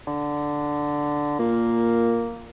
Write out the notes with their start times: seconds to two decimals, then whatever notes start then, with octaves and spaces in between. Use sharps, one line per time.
0.07 D3
1.39 A#2 A#3